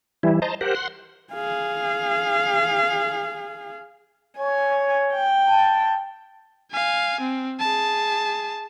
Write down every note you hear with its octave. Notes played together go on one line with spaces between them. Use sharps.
E3 G3 E4
C5 D#5 A5 A#5
G4 A#4 C5 F#5
F#5 C6
G#4 F5
C#5 G#5
G5
A5
F5 G#5
C4
G#4 A5